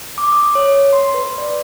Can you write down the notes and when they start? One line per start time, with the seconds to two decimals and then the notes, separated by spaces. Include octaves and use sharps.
0.18 D6
0.32 D#6
0.55 C#5
0.93 C6
1.14 B4
1.38 D5